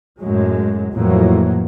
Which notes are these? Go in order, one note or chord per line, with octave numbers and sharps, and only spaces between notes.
F#2 A2 F#3 G#3
F2 A2 E3 F#3 A#3